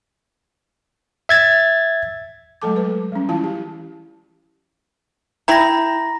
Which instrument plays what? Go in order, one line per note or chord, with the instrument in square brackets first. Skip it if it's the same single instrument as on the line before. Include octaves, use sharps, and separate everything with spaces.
[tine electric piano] E5 G#6 A6
[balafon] F#3 G#3 A3 A4 A5 D6
B4
G3 C#4
E3 E4 F4 F5 A5
G4
[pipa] E4 G5 [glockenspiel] A#5 B5 A#6